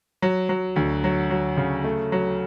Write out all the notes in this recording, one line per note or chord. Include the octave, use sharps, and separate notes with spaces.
F#3
F#3
D2
F#3
F#3
C#3
A3
F#3